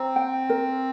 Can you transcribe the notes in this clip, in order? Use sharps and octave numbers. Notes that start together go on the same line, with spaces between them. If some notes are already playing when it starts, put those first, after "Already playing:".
Already playing: C4 A#5
G5
A#4